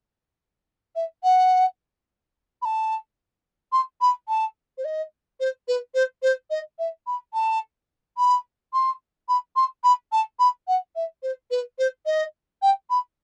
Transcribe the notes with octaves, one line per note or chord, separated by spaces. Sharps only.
E5
F#5
B5
A5
C6
B5
A5
C5
D#5
C5
B4
C5
C5
D#5
E5
B5
A5
B5
C6
B5
C6
B5
A5
B5
F#5
E5
C5
B4
C5
D#5
G5
B5